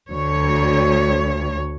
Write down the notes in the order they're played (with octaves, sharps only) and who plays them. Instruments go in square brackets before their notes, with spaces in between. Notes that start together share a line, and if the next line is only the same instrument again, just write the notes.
[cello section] D2 C#5